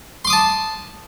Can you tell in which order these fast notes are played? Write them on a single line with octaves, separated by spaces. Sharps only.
C6 D6 D#6 A5